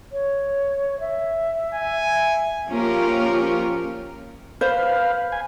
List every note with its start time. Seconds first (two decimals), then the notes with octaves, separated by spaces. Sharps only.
0.12 C#5
1.00 E5
1.74 G#5
2.69 F3 A#3 C#4 F4 G4 A#4
4.61 B4 C5 F5
5.32 G#5